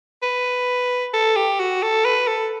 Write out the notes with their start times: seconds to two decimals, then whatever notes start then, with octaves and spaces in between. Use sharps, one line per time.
0.23 B4
1.14 A4
1.36 G4
1.59 F#4
1.83 A4
2.05 B4
2.28 A4